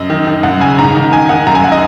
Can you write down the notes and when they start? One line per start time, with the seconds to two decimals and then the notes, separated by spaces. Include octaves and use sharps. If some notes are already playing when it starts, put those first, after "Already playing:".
Already playing: F#2 D#5
0.10 D#3
0.27 D#3
0.43 F#2 F#5
0.60 C#3 G#5
0.78 G#2 A#5
0.95 D#3
1.12 D#3 G#5
1.29 D#3 F#5
1.47 F#2 A#5
1.55 G#5
1.64 F#5
1.72 D#5